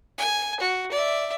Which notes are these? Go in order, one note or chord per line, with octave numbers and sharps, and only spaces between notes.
G#5
F#4
D5 E5